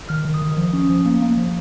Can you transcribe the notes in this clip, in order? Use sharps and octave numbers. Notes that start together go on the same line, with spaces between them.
D#3 F6
D#3
D#6
D#3
F3
C#4
F3
A#3
A#3
F3